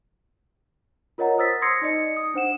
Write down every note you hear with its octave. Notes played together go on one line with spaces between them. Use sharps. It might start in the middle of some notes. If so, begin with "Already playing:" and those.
F4 A#4 C#5 D#5 F#5 A#5
C5 D#6 E6 A6 B6
C6 D#6 G#6 A#6 C7 C#7
D#4 D5 D#5 C#7
D#6
D4 C5 F#5 E7